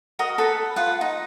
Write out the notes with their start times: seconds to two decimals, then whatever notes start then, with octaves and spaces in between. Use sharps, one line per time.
0.19 F#4 A#4 D#5
0.38 A4 B4 B5
0.76 F4 B4 F#5
1.01 D#4